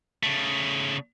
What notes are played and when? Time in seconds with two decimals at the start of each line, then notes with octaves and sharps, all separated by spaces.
0.23 C#3 A3